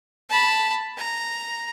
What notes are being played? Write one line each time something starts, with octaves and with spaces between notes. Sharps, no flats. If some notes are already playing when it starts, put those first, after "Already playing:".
A5 B5
A#5